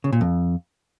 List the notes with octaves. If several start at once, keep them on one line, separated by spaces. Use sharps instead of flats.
C#3
A#2
F2